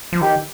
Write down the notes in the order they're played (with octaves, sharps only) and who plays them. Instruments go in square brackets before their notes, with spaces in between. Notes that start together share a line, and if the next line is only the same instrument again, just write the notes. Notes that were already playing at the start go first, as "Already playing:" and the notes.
[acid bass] F3
[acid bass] D#3 [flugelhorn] G4